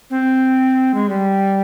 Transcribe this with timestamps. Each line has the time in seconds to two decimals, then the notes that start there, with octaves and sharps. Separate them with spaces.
0.10 C4
0.94 G#3
1.09 G3